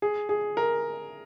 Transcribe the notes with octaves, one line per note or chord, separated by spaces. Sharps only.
G#4
G#4
A#4